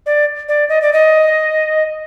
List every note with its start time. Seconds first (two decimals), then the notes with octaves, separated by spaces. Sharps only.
0.06 D5
0.49 D5
0.69 D#5
0.82 D5
0.93 D#5